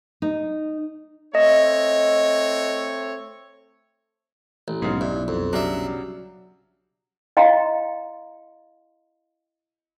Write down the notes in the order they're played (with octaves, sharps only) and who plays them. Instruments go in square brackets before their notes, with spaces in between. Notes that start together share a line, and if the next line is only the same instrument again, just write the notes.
[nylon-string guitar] D#4
[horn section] A3 C4 C#5 [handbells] D#5
[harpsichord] A1
[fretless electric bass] B1 [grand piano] G#2 C#3
[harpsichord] G2 [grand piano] E4
[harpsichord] F2
[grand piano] C#3 F#3 G3 [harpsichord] D4 E5
[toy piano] E4 D#5 F5 G5 A#5 C6